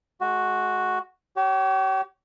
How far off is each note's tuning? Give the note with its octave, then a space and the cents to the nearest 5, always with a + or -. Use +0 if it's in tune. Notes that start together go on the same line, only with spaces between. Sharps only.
G#3 +35 F#4 +0
G4 -40 C#5 +0